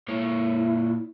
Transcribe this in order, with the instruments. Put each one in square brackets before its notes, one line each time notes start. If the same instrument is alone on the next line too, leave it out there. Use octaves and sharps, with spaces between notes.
[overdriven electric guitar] A#2 C#5 [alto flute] E4